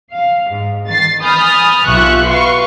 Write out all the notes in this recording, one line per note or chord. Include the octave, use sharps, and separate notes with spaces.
F5
G#2
D#3 A6 C7
G#5 B5 D#6 F6 G6 A6
B1 F4 G4 E5 C#6 F#6
F#4 B4 F5 C6 C#6